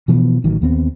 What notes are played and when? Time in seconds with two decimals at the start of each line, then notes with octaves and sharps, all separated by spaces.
0.08 B2 E3 F3 B3
0.44 A1 D#3 F#3
0.62 D#2 B3 C4